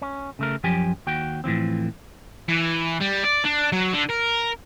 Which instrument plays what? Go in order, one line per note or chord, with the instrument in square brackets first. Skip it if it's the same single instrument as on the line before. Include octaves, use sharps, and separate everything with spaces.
[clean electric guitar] C#4
C#3 A3 A#4
F#2 F3 G4 G5 G#5
D#2 F#4 G5
A2 E3 F3 C4
[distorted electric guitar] E3
G3
D5
D4
F#3
D3
A#4